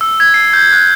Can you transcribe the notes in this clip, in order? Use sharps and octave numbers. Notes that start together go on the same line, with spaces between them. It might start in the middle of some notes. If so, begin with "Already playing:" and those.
E6
G#6
C7
G6
F#6